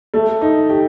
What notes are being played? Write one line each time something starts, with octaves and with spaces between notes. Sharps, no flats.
A3
D#4
G4